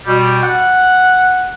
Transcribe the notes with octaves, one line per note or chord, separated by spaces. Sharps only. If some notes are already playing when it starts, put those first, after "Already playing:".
B2 G3
F#5